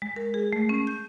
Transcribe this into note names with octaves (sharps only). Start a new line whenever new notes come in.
G#3
A#4
G#4
A3
C#4
G6